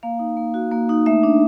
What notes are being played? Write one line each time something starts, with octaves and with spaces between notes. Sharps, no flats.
A#3 F5
D#4
A#3
F#4
A#3
D#4
A3 E5
D4